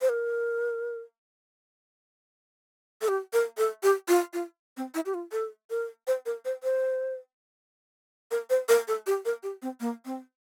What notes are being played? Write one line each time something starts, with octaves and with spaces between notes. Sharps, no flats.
C5
A#4
A4
G4
A#4
A4
G4
F4
F4
C4
E4
G4
F4
A4
A#4
C5
A#4
C5
C5
A#4
C5
A#4
A4
G4
A#4
G4
C4
A#3
C4